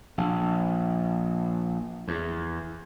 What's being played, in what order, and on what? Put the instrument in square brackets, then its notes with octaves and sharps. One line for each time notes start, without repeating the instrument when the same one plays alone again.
[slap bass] A#1
E2